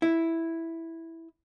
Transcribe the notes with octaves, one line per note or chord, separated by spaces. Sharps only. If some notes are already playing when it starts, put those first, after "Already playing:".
E4